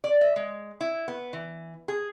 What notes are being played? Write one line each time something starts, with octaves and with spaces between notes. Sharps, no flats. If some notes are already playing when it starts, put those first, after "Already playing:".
D5
E5
G#3
E4
B3
E3
G#4